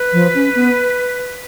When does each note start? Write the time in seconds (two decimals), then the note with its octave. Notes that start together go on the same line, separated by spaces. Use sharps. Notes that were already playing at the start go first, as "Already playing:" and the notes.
Already playing: B4
0.13 F3
0.35 C#4
0.55 B3